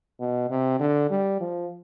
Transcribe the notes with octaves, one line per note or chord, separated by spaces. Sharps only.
B2
C3
D3
G3
F3